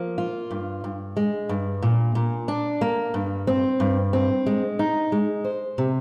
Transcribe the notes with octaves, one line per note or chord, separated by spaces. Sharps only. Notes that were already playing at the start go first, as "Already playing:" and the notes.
Already playing: F3 A#3
F4
G2
G2
G#3
G2
A#2
A#2
D4
A#3
G2
C4
G2
C4
G#3
D#4
G#3
C5
C3